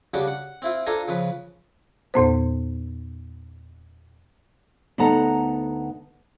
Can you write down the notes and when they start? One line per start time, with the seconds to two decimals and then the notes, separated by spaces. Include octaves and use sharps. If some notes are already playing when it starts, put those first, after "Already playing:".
0.14 C#3 G3 D4 F#4 G4
0.28 F#5
0.62 C4 E4 F4
0.86 D4 F4 A4 C5 G#5 A#5
1.08 C#3 F3 B4
2.14 E2 A#2 B3 C5
4.98 D2 B3 D#4 A4 F#5 A#5